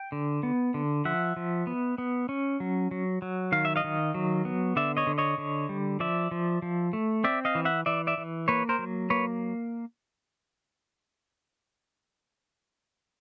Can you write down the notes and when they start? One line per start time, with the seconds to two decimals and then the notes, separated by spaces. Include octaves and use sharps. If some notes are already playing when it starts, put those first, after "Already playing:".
Already playing: G5
0.12 D3
0.43 B3
0.74 D3
1.05 F3 E5 F#5
1.36 F3
1.67 B3
1.98 B3
2.29 C#4
2.60 F#3
2.91 F#3
3.22 F#3
3.52 D#3 F5
3.65 E5
3.76 D#5 F5
3.84 D#3
4.14 F#3
4.45 B3
4.76 D3 D5 E5
4.97 C#5 D#5
5.07 D3
5.18 C#5 D#5
5.38 D3
5.69 G3
6.00 F3 D5 E5
6.31 F3
6.62 F3
6.93 A3
7.24 C4 D5 E5
7.45 D#5 F5
7.55 E3
7.65 E5 F#5
7.86 E3 D5 E5
8.07 D5 E5
8.18 E3
8.48 A#3 B4 C#5
8.69 A#4 C5
8.79 F#3
9.10 A#3 B4 C#5